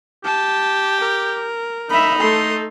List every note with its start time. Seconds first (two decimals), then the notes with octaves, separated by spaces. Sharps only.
0.24 G4 A5
1.00 A#4
1.90 D#4 E5 B5
2.19 A3 A4 C6